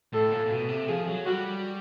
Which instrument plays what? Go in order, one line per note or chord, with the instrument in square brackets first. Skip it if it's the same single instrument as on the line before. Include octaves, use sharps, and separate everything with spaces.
[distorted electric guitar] A2 [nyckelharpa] A4
[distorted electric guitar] A#2
A#2
B2
C3
[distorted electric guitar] F3 [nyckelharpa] G#4
[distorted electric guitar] F#3
[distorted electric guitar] G3 [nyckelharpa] F#4